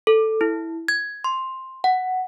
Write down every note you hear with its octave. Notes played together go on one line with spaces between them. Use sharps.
A4
E4
G#6
C6
F#5